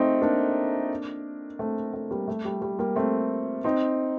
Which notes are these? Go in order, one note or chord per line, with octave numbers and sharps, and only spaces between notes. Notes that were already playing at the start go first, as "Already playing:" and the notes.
Already playing: A3 C4 D#4
A#3 D4
A3 C4
A3
G3 A#3
A3
G3
G3
G3 A#3
A3 C4
C4 D#4